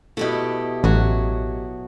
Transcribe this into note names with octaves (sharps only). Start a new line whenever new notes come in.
B2 A3 E4 G4 D#5
A1 F#3 F#4